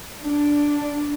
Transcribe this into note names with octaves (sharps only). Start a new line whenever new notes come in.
D4